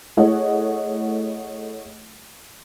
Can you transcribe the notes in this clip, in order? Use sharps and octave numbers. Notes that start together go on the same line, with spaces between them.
A3 E4 G#4 C#5 D#5 F#5